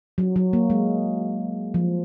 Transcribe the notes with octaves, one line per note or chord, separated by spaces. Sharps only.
F#3
F#3
A#3
G#3
F3